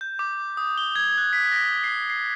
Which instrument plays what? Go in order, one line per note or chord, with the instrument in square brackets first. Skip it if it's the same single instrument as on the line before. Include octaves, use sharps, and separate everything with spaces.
[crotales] G6
D6
D#6
G7
G#6
F#6
B6
A#6
C7
C7